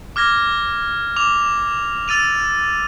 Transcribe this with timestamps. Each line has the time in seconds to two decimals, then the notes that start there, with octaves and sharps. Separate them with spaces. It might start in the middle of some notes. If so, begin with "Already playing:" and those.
0.16 D6 F6 G#6 A#6
1.16 D6 F7
2.08 E6 A6 D#7 F7